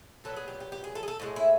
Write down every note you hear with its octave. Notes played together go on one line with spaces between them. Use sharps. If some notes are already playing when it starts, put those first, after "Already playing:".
A#2 F#3 B3 A4
G#4
G4
G4
G4
G#4
A4
G#4
A4
A2 E3 G#3
E4